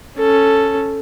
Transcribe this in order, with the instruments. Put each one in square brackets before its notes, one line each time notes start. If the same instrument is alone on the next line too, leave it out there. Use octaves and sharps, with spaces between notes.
[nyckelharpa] C#4 A4